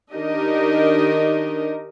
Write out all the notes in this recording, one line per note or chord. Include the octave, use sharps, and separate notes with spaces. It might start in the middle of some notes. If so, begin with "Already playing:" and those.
D#3 D4 D#4 G4 A#4 D#5